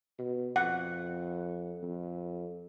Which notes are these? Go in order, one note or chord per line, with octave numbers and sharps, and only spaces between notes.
B2
F2 F#5
F2